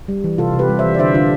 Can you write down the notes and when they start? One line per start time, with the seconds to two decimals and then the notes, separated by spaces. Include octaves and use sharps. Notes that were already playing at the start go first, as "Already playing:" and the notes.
0.08 G3
0.24 E3
0.38 C3 F4 A4
0.53 C3
0.59 G4 B4
0.69 G3
0.79 C5 E5
0.84 E3
0.94 D5
0.99 D3 C5 E5
1.14 D3 D4 F4